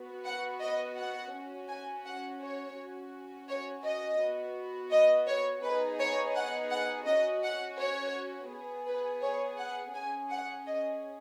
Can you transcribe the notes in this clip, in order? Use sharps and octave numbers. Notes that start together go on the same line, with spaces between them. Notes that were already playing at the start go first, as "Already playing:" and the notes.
Already playing: B3 F#4
F#5
D#5
F#5
C#4
F#4
G#5
F#5
C#5
C#4 F#4
C#5
D#5
B3 F#4
D#5
C#5
B3 D#4 G#4 B4
C#5
F#5
F#5
C#4 F#4 D#5
F#5
C#5
B3 G#4
B4
C#5
F#5
C#4 G#4 G#5
F#5
D#5